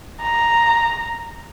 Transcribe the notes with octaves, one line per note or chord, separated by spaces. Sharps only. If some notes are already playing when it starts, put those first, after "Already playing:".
A#5